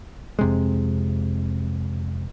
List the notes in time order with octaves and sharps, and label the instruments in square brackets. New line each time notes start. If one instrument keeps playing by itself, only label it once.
[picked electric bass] F2 C3 G#3